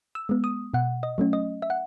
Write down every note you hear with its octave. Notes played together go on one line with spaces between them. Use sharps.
E6
G#3 B3
D#6
B2 F#5
D#5
F#3 A3 C#4
D#5
E5
F#5